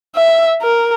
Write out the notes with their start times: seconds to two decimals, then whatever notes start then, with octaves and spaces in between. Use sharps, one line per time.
0.15 E5
0.63 A#4